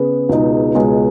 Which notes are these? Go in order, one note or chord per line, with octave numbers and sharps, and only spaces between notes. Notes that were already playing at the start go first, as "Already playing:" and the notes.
Already playing: C#3 B3 G#4 B4
C#2 B2 G#3 D#4
C#2 B2 G#3